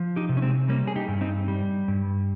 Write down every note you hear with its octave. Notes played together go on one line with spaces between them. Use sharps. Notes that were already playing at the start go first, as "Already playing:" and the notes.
Already playing: F3
D#4 G4
C3
C#4
G#3 C4
G3 A#3 C#4
G#4
D#4 G4
G2
C4 D#4
G3
G2